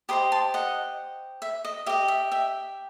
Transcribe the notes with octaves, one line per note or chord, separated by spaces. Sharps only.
G4 C5 D#5 B5 D#6
A5 C6
D#5 F#5
E5
D#5
G4 D#5 E5
E5
E5 G5